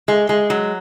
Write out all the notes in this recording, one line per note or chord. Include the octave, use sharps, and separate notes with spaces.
G#3
G#3
F#3